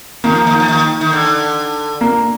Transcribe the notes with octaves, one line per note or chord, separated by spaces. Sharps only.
D#3 A#3
F3
D#3
F3
D#3
D#3
D3
A#3